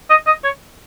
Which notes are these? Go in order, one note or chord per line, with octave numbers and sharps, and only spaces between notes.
D#5
D#5
C#5